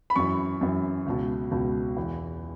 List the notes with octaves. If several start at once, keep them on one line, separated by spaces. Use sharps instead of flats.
B5
F#2 E3 C#6
F#2 E3
C#2 B2
C#2 B2
E2 E3